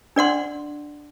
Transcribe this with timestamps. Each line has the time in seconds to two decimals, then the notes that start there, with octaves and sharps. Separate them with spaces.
0.16 D4 D5 F#5 C6